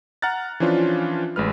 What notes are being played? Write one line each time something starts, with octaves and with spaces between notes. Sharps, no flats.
F#5 A#5 F6 F#6 A6
E3 F3 C#4 D4 F4
A1 G#3 B4 F6